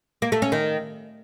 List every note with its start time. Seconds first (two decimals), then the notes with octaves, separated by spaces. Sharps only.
0.22 A#3
0.32 A3
0.42 C#4
0.52 D#3